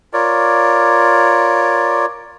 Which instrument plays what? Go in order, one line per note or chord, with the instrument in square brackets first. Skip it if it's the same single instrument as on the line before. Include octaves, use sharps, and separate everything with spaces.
[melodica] F4 A#4 C#5 D5